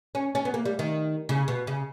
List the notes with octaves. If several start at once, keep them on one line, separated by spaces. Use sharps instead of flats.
C#4
C#4
B3
A#3
G3
D#3
C#3
B2
C#3